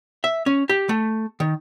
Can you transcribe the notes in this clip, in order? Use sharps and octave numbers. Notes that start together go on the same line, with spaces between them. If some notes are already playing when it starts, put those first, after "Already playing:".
E5
C#4
G4
A3
D#3